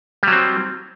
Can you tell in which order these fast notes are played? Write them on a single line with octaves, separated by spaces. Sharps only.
G3 F#3 C4